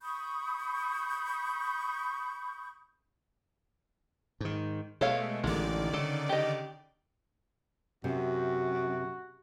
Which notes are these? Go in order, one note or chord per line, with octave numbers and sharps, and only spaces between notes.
B5 C#6 D#6 G6
G#2 D#3
B2 G#3 A3 A4 C#5 F5
A1 D3 D#3 G#3 D5
C#3 A4
G4 D#5
F#2 C3 F#4